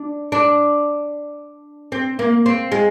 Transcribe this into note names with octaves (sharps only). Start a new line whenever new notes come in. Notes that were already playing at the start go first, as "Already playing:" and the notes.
Already playing: D4
D4
C4
A#3
C4
G#3